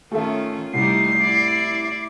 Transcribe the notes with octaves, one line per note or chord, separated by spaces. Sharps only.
D#3 A3 C#4 F4 A4 E5
C2 G3 A3 D#4 C7
E4 D5